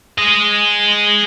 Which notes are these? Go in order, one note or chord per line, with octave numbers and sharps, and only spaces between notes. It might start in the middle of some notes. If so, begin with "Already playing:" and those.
G#4 D#5